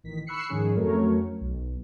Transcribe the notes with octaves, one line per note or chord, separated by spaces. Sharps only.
A1 D#3 B6
B5 C#6 E6 F#6 C7 C#7
G#2 D#3 F3 C#4 G#4
F2 F#3 A3 C#4 A#4 C#5
B1